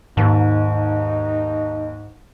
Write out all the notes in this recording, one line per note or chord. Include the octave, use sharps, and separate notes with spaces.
D#2 G#2 D#4